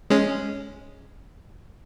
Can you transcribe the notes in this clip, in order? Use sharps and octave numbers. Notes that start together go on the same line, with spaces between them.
G#3 C#4